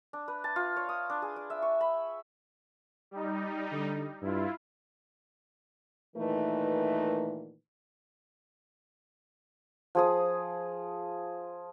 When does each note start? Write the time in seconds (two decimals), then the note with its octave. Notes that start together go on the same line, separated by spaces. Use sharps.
0.13 D4
0.28 B4
0.44 A5
0.56 F4
0.76 C#5
0.89 D#6
1.10 D4
1.22 G#4
1.36 D5
1.50 E5
1.62 C#6
1.81 B5
3.11 G3 D#4
3.72 D3
4.22 G2 E4 F4
6.16 A#2 D#3 E3 A3 D#4 B4
9.95 F3 G#4 D#6